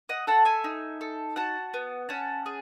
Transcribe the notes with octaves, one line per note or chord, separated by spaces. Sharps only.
D#5 F#5
A4 F#5 A5
E5 G#5
D#4
A4
F#4 F#5 A5
B3
C#4 F#5 A5
G#4